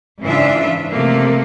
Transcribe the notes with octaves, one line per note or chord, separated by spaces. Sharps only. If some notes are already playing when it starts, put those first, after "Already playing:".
G#2 C#3 E3 D4 F4 E5
C3 F3 A3 A#3